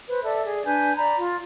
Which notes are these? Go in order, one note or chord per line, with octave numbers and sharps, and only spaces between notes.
B4 C5
A4 D5 E5
G#4 D5
D4 B4 G#5 G6
D5 A#5 B5
F4